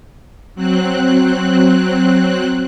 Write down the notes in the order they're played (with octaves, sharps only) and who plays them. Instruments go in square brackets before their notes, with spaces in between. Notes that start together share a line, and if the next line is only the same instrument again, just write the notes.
[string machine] F#3 C4 F#6